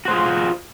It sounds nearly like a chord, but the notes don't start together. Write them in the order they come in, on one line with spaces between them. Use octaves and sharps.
F#4 C5 G#4 F4